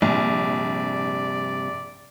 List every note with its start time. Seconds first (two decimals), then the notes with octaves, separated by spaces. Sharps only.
0.02 A#1 G2 C3 D5